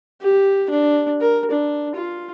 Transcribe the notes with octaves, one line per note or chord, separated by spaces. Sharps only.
G4
D4
A#4
D4
F4